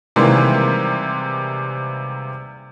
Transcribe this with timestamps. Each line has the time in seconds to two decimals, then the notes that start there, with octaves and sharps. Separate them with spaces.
0.16 C3 D#3 E3 G3 G#3 A#3